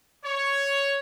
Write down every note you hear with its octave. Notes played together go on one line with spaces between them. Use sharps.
C#5